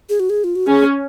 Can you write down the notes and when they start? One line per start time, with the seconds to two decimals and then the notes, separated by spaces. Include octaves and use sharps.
0.09 G#4
0.20 F#4
0.30 G#4
0.44 F4
0.56 F#4
0.67 C#4 G#4